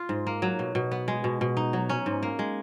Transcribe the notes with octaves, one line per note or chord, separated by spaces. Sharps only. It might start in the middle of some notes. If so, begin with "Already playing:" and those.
Already playing: F4
G#2
A#3
F#3
B2
B2
B3
G#3
B2
B2
D#4
F#3
C#4
G#2
A#3
G#3